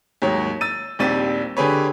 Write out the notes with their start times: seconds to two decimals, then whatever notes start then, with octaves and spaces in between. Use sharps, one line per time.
0.22 D#2 G#2 F#3 C#5
0.61 E6 A6 D#7
0.99 A#1 D#2 G3 C4 A6 D#7
1.57 D3 G4 G#4 B4 C#5